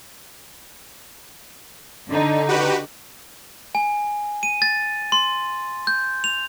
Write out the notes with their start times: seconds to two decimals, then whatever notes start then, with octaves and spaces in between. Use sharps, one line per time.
2.10 D3 D#4
2.49 F#4 G4 B4
3.75 G#5
4.43 D#7
4.62 A6
5.12 C6
5.87 G6
6.24 F7